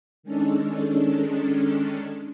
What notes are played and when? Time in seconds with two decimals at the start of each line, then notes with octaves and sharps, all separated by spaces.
0.23 D#3 G#3 C#4 D4 A4